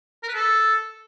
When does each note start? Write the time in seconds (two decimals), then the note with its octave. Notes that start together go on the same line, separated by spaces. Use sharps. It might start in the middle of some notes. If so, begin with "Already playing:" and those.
0.23 A#4
0.29 B4
0.34 A4